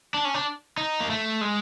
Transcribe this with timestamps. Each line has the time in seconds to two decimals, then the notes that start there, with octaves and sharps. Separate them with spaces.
0.14 D4
0.25 C#4
0.34 D4
0.78 D#4
1.00 A#3
1.10 A3
1.41 G#3